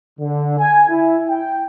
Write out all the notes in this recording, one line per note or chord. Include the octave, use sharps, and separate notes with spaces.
D3
G#5
E4
G5